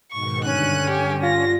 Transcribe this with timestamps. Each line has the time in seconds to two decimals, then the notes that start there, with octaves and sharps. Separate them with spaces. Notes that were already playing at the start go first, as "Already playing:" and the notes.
0.12 G#2 B2 D#3 C#6
0.44 G2 D3 C#4 F#6 D#7
0.90 G4 G#5
1.22 F4 A#6